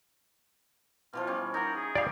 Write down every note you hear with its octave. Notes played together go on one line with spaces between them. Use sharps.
B2 E3 F3 F4
G3 C#4
D#4 A#4 F#5
G#4
G3 D#4 D5 F5